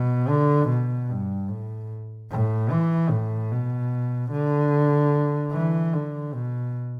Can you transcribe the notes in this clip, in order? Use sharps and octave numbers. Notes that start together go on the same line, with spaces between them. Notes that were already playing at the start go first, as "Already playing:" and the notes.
Already playing: B2
D3
B2
G2
A2
A2
E3
A2
B2
D3
E3
D3
B2